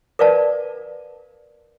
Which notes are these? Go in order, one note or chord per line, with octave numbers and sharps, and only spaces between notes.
A#4 B4 D5 F5 A5